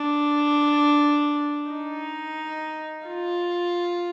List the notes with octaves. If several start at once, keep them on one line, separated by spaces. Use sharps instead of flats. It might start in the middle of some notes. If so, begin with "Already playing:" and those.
Already playing: D4
D#4
F4